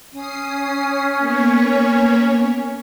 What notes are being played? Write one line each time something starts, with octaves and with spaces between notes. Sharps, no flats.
C#4 D#6 C7
A#3 B3 C#5